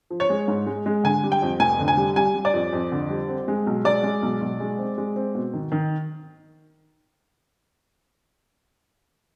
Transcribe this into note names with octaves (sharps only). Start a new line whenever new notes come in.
F3
C#5
G#3
G#2
G#3
G#3
D3 G#5
G3
G5
F2
F1 G#5
D3
G#5
G3
G3 G#5
G3
D5
F2
F2
D3
G3
C4
G#3
B1
G#3 D5
G#3
B1
B1
G#3
C4
G#3
C4
B2
D#3
D#3